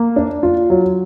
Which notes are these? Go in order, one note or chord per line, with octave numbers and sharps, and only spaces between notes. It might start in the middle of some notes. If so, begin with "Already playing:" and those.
Already playing: A#3
D4
F4
F#3